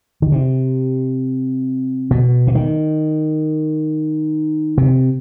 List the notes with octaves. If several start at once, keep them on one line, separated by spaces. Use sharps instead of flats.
D#3
C3
B2
C3
D#3
C3